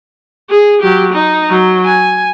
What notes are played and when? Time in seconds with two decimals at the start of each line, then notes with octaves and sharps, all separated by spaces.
0.50 G#4
0.82 F#3 G4
1.13 D#4
1.50 F#3
1.85 G#5